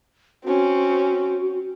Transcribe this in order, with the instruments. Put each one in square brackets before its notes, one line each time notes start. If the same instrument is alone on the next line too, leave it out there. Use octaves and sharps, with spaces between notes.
[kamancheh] C4 C#4 [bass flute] F#4